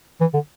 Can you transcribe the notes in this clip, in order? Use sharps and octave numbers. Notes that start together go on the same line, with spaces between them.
E3
D3